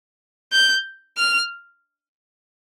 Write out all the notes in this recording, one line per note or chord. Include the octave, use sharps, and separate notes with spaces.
G6
F6